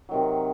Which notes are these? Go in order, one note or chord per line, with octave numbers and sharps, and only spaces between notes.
C3 D#3 F#3